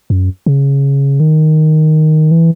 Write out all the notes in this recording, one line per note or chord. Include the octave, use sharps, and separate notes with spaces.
F#2
C#3
D#3
E3